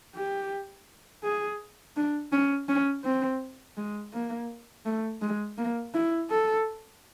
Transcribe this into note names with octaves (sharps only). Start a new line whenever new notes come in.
G4
G#4
D4
C#4
C#4
C4
G#3
A#3
A3
G#3
A#3
E4
A4